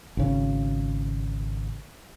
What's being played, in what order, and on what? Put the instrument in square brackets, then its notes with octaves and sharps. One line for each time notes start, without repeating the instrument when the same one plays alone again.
[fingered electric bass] G#1 C#3